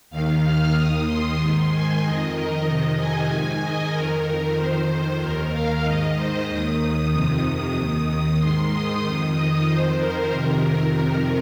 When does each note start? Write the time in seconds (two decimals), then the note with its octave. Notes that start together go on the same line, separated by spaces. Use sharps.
0.10 D#2 D#3 F5
0.43 F6
0.74 D#2 D#3 D#6
1.06 C6
1.38 G#2 D#3 C6
1.70 G#5
2.01 F2 D#3 D#5
2.34 A#4
2.65 F2 C3 D#3 D#5
2.97 G#5
3.29 G#2 D#3 G#5
3.61 D#5
3.93 F2 D#3 A#4
4.56 F2 D#3 C5
5.20 D#2 D#3 A#4
5.52 F5
5.84 G#2 D#3 D#5
6.16 C5
6.48 D#2 D#3 D#6
7.12 F2 C3 D#3
7.43 D#6
7.75 D#2 D#3
8.39 G#2 D#3 C6
8.71 D#6
9.02 F2 D#3
9.34 D#5
9.66 F2 D#3 C5
9.99 A#4
10.30 F2 C3 D#3
10.94 F2 C3 D#3 A#4